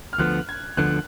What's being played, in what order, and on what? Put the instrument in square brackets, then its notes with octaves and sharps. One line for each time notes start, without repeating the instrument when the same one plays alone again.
[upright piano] F6
[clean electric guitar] D2 D3 F3 B3 [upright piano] F#6
[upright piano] G#6
[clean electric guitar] D2 D3 F3 B3 [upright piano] F#6